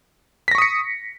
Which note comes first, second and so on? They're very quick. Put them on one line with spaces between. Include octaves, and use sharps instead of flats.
B6 A#6 C#6 D#6 C#7